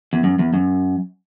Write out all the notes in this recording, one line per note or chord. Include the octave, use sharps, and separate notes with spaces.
E2
F#2
E2
F#2